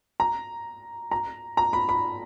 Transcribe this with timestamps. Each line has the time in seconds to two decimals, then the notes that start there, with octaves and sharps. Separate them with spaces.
0.20 A#5
1.11 A#5
1.57 A#5
1.73 B5
1.89 B5